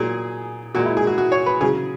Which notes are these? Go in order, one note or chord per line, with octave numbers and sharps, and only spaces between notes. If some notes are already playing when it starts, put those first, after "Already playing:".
Already playing: A#2 F#3 G#4
A#2 G#3 F#4
E4
G#4
F#4
F#4
C#5
B4
C#3 F#3 G#4